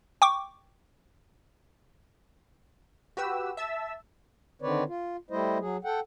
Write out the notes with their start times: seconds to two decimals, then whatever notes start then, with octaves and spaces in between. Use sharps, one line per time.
0.22 G5 C#6 D6
3.17 F#4 G4 B4 E6
3.57 E5 A5 E6
4.62 D3 D#3 C4 B4 C#5 D5
4.88 F4
5.30 G3 A3 E4 C5 D#5
5.59 F#3 G#4
5.84 A4 F#5 G5